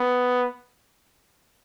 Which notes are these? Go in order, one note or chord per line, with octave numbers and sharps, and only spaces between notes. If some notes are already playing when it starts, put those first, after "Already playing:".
Already playing: B3